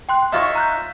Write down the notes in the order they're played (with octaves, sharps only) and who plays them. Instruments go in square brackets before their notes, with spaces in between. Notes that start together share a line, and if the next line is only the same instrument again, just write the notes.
[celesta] G5 C6 F#6
[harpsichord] D#4 F4 C#5 [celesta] D#5 C#6 [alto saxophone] E5
[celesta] A#5 F#6 G6